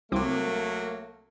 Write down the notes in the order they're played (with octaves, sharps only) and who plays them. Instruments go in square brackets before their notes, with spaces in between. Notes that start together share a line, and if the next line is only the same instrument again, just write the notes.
[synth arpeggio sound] C2 C4 D6 [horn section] F#3 A3 A#3